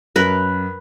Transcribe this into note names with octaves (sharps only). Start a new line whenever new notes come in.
F#2 A#4 B4